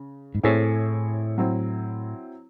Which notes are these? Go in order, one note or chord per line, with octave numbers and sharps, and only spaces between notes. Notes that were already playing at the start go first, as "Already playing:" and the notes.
Already playing: C#3
G#2
A2 A3 C4 E4 G#4 C#5
F#3 C4 E4